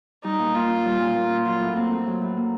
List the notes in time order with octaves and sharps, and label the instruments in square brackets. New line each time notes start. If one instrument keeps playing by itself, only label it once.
[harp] G3 [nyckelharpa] D#4
[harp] A#2
[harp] A#3 [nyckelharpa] F4
[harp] C#4
G3
A#2
A#3
C#4
[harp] F#3 [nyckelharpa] F4
[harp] A2
[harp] A#3 [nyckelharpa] C4
[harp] A2
F#3
A2
A#3